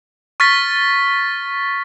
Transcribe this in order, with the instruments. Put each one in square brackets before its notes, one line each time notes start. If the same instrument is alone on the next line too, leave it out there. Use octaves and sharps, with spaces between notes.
[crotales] C#6 F6 A6 B6